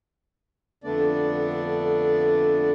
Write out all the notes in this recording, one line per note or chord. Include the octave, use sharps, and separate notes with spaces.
F2 D3 A3 B3 D4 D5